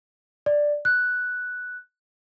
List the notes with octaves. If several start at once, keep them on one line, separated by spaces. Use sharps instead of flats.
D5
F#6